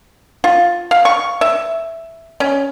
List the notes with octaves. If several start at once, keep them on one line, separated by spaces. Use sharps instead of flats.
F4
F5
C#6
E5
C#4